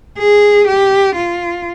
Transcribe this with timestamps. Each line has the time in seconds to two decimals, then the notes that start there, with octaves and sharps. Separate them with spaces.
0.18 G#4
0.67 G4
1.15 F4